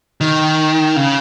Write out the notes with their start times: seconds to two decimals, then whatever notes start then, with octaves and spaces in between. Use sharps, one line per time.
0.21 D#3
0.96 C#3